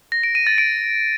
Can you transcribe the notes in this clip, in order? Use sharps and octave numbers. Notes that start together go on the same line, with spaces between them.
A#6
D7
D#7
A6
D7